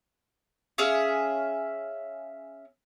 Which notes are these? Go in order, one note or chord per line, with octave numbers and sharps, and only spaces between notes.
C#4 G#4 E5 F5